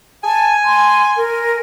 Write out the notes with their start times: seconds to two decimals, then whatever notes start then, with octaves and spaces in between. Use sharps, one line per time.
0.24 G#5 A5
0.65 C6
1.17 A#4